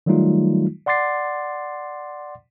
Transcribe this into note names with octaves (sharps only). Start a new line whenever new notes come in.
D#3 F#3 G3 A3 D#4 F4
D5 F#5 C6 D6 A6 C7